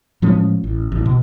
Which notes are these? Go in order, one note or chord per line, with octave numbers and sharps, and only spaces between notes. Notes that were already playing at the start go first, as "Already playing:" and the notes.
A2 F3 G#3 C#4
A1
A1
B2